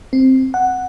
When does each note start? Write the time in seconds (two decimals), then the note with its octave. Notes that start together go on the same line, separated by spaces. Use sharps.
0.13 C4
0.54 F#5